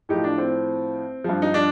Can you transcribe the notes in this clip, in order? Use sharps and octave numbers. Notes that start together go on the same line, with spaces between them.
A2 F3 D#4 G4
D4
C4
G2 F3
D#4
D4